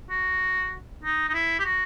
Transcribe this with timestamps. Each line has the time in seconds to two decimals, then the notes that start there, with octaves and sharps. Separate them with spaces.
0.10 F#4
1.03 D#4
1.29 D#4
1.34 E4
1.59 G4
1.65 F#4